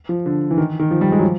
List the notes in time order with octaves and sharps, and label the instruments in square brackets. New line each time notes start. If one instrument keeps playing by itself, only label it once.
[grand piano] F3
D3
E3
D#3
D#3
F3
G3
G#3
F#3
F3